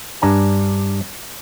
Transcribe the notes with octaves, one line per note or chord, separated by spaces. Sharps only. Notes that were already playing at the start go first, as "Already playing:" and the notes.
G2 D4 G#5 A#5